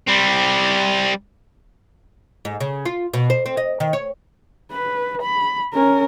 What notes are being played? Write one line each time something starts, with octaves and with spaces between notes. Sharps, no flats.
G3 C4
G#2
C#3
F4
B2
C5
C4
D#5
D#3
C#5
B4
B5
C#4 A#4